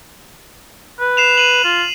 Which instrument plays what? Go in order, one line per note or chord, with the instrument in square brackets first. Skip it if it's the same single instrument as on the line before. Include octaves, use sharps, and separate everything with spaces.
[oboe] B4
[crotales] C7 E7 F7
D#7 F#7
[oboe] F4